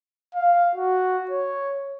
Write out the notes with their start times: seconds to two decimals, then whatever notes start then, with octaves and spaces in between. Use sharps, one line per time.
0.34 F5
0.75 F#4
1.31 C#5